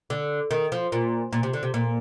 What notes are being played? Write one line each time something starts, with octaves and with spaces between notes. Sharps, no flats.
D3
D#3
F3
A#2
A#2
C3
D3
C3
A#2